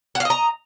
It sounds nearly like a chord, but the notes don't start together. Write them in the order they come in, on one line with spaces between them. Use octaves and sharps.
F#5 F5 D#5 A#5